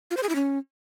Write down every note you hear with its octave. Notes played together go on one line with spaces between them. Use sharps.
F4
C5
G#4
E4
C#4